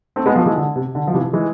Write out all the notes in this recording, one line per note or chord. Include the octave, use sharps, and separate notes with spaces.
A3 C4
G#3 B3
F3 A3
E3 G#3
D3
C3
D3
F3
C3 E3
E3 G#3